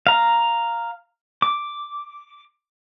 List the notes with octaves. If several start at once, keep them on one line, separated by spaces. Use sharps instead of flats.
F5 A#5
D6